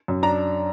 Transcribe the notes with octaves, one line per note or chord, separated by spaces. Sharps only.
F#2
D4 A#5